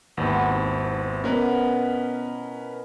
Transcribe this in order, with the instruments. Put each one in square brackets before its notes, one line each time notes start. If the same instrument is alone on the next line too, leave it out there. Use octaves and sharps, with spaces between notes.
[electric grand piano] G#1 D#2 [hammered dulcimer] B3 C4 E4
[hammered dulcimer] B2 [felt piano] B3 [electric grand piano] C#4 A#4 B4